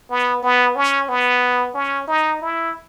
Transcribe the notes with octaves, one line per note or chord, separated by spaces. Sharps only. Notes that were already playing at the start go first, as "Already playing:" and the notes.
B3
B3
C#4
B3
C#4
D#4
E4